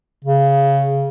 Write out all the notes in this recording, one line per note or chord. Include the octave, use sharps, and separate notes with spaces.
C#3